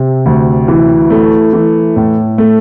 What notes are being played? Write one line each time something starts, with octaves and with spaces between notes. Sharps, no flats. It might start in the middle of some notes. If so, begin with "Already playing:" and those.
Already playing: C3
D2
E3
A3
E3
A2
A3